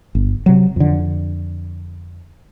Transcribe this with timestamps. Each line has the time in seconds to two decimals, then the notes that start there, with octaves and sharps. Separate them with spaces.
0.15 G1
0.46 C3 F#3
0.76 F2 D3